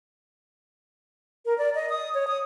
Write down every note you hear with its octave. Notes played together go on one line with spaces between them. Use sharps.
A#4
D5
D#5
D#6
C#5
D#6